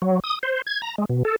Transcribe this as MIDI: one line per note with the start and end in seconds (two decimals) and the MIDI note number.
0.02 0.20 54
0.24 0.39 87
0.43 0.62 72
0.66 0.81 92
0.82 0.95 82
0.98 1.05 56
1.09 1.23 47
1.25 1.36 69